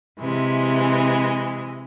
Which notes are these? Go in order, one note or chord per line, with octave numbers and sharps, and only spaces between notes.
C3 E3 G#3